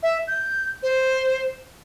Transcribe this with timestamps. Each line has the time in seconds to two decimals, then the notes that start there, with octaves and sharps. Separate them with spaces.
0.03 E5
0.27 G6
0.82 C5